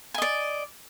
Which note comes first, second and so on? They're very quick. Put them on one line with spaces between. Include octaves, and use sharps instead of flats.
G#5 D#5 D5